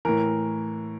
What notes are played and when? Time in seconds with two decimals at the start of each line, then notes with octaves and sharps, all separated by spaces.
0.05 A2 E3 A#4